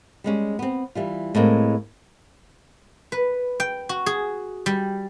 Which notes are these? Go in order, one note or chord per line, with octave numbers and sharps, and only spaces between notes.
G3 G#3 C#4
B3 C4
E3 G3 F4
A2 G#3 A#3 C4
B4
G5
F#4
G#4
G3